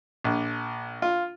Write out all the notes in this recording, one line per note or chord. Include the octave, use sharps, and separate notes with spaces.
A#1
F4